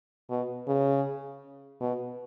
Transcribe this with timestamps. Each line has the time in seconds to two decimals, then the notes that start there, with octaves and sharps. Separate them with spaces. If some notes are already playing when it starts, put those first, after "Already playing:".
0.30 B2
0.68 C#3
1.81 B2